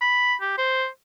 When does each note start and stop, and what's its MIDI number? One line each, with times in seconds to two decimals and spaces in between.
0.01 0.34 83
0.41 0.57 67
0.58 0.86 72